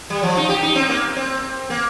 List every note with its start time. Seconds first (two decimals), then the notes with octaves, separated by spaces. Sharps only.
0.10 G3
0.23 F3
0.37 D#4
0.49 G4
0.63 D#4
0.75 C4
0.89 A#3
1.16 C4
1.70 A#3